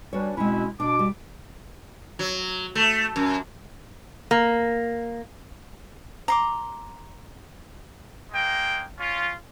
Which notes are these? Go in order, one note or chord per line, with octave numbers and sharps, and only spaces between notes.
G3 C#4 D4 F#4 B4 C#5
B2 G#3 C4 C#4 E4
B2 D4 D6
G3
F#3
A3
F#2
A#3
A#5 C6 D6
G#3 A#3 G5
C#4 F4